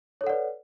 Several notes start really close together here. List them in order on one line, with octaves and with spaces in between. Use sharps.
C#5 A4 F#5 D5 B4